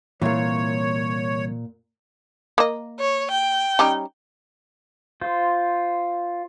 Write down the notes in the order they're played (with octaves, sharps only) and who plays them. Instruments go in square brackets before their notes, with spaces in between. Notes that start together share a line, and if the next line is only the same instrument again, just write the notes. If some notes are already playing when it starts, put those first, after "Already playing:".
[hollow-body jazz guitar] C2 E3 [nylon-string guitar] A#2 F5 [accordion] C#5
[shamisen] A#3 D#5
[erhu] C#5
G5
[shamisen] G3 C#4 D#4
[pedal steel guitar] F4 C5